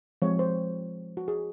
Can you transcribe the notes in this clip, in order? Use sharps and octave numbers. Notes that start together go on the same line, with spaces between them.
F3 G#3 C4 C#5
C5
F#4
G#4